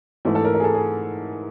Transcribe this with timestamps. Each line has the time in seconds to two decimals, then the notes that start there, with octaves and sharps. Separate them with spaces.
0.25 G#2 E3 A3
0.35 A4
0.45 A#4
0.55 A#4
0.60 G#4
0.64 A4
0.75 G#4